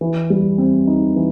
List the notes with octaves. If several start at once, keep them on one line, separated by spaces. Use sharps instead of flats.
E3
G3
C4
D#4
E3